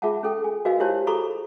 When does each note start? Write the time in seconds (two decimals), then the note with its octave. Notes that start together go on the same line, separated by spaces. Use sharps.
0.02 F4 G#4 E5 F#5 A5
0.23 C#4 G#4 A4 G5
0.44 G#5
0.65 F#4 A#4 B4 D#5 F5 G#5
0.80 E4 F4 G4 C5 C#5 A5
1.07 F#4 G#4 A4 A#5 B5 C#6